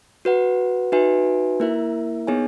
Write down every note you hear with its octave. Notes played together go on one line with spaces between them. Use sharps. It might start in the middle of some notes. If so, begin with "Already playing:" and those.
F#4 B4 F#5
D#4 F#4 B4 E5 G#5
A#3 E4 A#4 E5
B3 D#4 G#4 C#5 G#5